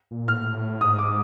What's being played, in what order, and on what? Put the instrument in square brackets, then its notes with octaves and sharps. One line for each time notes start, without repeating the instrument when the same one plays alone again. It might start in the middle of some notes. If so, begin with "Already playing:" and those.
[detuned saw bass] A#2
[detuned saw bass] A2 [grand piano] F6
[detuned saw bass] G#2 [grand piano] D#6
[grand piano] D6